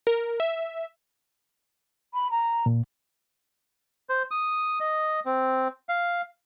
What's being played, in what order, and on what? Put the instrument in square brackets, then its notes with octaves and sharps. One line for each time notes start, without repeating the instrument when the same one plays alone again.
[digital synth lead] A#4
E5
[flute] B5
A#5
[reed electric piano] A#2
[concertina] C5
D#6
D#5
C4
F5